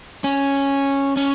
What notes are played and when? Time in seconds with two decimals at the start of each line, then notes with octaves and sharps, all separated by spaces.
0.24 C#4
1.17 C#4